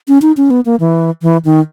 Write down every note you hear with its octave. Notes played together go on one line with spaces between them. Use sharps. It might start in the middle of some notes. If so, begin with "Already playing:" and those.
C#4
D#4
C#4
B3
A#3
E3
E3
D#3